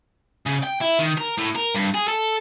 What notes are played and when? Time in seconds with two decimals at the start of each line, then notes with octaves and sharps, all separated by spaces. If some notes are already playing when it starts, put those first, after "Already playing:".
0.47 C#3
0.64 G5
0.81 E4
1.00 D#3
1.18 A#4
1.38 A2
1.56 A#4
1.75 G2
1.95 G#4
2.08 A4